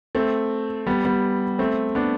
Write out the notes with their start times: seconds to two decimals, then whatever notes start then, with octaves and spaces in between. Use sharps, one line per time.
0.15 A3 C4
0.86 G3 B3
1.05 G3 B3
1.59 A3 C4
1.95 B3 D4